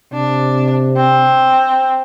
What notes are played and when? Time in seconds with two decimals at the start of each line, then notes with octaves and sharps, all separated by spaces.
0.13 C3 D4
0.96 C4